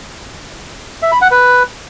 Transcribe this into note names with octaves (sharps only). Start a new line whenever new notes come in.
E5
B5
F#5
B4